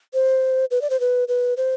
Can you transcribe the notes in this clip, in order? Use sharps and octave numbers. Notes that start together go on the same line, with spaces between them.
C5
B4
D5
C5
B4
B4
C5